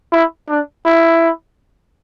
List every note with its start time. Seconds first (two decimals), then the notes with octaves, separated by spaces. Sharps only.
0.13 E4
0.49 D4
0.86 E4